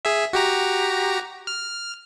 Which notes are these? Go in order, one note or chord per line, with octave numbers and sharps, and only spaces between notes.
G#4 E5
F#4 G4 A#5
F6